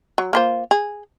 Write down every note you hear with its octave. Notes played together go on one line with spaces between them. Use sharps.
F#3
A#3 F4 C5
G#4